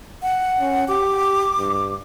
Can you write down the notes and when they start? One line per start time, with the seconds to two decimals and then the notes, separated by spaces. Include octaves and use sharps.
0.22 F#5
0.60 C#4
0.88 G4 D6
1.59 G2